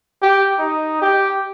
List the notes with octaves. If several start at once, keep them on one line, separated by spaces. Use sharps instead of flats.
G4
D#4
G4